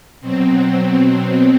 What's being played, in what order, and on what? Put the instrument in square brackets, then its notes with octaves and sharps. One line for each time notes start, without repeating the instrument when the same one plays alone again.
[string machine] B2 F#3 C4